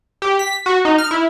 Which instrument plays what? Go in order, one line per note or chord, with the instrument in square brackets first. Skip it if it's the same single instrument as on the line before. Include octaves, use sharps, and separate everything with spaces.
[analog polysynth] G4
B6
F#4
D#4
F6
E4